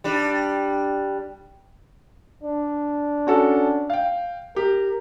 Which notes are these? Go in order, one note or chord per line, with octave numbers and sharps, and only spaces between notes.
G3 D4
D4
C#4 F#4 A4
F5 G5
G4 A#4